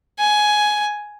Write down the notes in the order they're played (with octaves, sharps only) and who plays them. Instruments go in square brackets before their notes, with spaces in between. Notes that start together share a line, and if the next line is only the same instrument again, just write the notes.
[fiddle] G#5